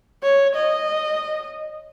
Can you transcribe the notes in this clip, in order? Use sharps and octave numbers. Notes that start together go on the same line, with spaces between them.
C#5
D#5